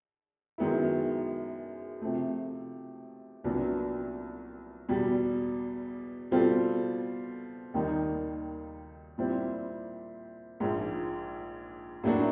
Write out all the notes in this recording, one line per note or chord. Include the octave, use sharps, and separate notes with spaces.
F#2 D#3 G#3 B3 E4
C3 F3 A3
C2 A#2 F#3 B3 D4
E2 B2 G3
B2 G3 C4 F4 A4
D#2 D#3 G3 A#3 D#4
A#2 G3 C4 E4
A#1 G#2 F3
A2 F#3 A#3 D4 F#4